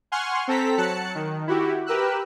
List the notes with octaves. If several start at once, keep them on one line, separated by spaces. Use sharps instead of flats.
F#5 G#5 C6 C#6 F6
C4 A4 A#5 B6
F#3 A5 F#6 C#7
D#3
E4 F#4 G4
G4 A#4 B4 E6 F#6